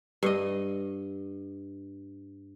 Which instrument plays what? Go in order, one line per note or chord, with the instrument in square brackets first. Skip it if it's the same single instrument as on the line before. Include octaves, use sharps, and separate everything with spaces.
[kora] G2 D#5